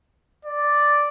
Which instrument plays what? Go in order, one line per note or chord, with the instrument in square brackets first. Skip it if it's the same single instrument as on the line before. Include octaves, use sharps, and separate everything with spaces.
[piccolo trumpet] D5